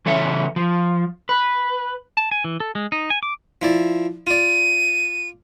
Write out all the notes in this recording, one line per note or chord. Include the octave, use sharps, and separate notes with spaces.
C#3 E3 A4 C#5 E5
F3
B4
A5
G#5
E3
A4
G#3
D#4
G#5
D6
F3 E4 D5
F4 D5 D#7